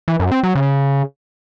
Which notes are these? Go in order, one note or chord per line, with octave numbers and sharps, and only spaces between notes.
E3
F#2
C4
F#3
C#3